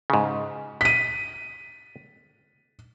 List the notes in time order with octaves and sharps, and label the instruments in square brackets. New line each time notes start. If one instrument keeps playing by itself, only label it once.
[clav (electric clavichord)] G#2 C#3
[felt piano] B6 D#7